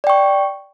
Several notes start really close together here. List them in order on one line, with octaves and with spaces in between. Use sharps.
D5 G5 C#6